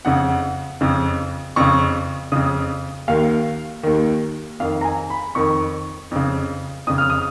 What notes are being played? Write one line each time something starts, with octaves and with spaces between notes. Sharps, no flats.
F2 C#3 F#5
F2 C#3
F2 C#3 C#6
F2 C#3 D#6
D#2 D#3 F5
D#2 D#3
F2 D#3 F5
A#5
G#5
B5
F2 D#3 C#6
F2 C#3
F2 C#3 D#6
F6
D#6